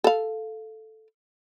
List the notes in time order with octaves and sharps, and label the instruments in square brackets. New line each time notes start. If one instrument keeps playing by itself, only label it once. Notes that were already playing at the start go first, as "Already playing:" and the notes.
[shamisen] A4 F5